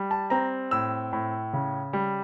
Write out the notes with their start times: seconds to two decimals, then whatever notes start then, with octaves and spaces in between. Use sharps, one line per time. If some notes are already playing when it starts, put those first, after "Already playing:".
Already playing: G3
0.11 A5
0.30 C4 A#5
0.71 A2 E6
1.13 A2
1.53 C#3
1.93 G3